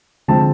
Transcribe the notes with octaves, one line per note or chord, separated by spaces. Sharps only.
D3 F3 G#3 C4 A5